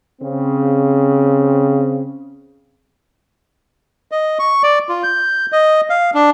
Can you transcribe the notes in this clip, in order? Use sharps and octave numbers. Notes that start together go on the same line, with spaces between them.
C#3 C4
D#5
C#6
D5
F4
G6
D#5
F5
D4